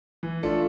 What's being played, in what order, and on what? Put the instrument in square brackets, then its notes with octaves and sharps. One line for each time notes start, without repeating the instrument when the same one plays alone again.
[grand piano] E3
[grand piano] A3 D4 A4 [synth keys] F4